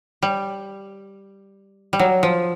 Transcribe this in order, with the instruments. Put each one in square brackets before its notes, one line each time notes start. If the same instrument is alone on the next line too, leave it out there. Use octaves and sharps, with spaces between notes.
[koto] G3
G3
F#3
F3